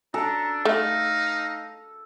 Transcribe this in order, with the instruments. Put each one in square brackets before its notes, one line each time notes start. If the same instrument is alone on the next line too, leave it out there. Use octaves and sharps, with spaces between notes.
[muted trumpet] D4 [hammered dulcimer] A4 [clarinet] A#5
[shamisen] A3 [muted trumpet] D#4 [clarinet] F5